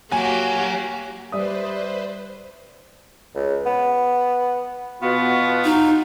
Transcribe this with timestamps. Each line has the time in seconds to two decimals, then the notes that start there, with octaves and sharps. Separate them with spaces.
0.12 F#3 A#3 F#4 G4 G#5
1.32 G3 B4 C5 D5 E5 D#6
3.35 C#2
3.66 B3
5.02 B2 B3 F4 F#4
5.65 D#4